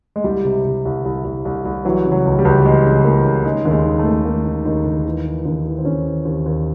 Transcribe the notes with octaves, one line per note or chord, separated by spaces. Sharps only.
G#3
C2 G3
C3
C3
C2
C2
C2
C2
C2
E3 F#3
C#3
F#3
C#2
G3
C#2
E3 G#3
C#3
E3 A#3
C#3
D#3 G#3
D#2
G#3
D#3
A3
D#2
D#3 A#3
D#3
D#2 D#4
D#2
E3
E3
D#2
E3
C4
D#2 C#4
E3
D#2
D#2